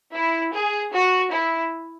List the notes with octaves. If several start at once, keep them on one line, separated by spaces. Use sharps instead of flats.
E4
G#4
F#4
E4